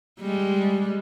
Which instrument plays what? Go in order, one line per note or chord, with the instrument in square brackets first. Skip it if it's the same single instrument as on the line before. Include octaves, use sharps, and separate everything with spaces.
[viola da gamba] G3 G#3